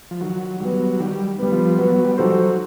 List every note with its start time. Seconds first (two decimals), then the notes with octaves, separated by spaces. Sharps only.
0.11 F3
0.21 D#3 F#3
0.60 F#3 G3 B3
0.99 D#3 G3
1.39 G3 B3
1.52 F3
1.78 F#3 B3
1.96 F#3
2.04 G3
2.17 F3 D#4 F#4 A4 C5
2.30 F#3